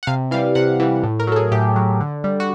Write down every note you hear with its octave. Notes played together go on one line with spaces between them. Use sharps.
F#5
C3 F5
E3 G3 F5
C3 F#5
E3 G3
A2
A#4
F#3 A4
G#4
A2 G4
F#3
D3
G3
F#4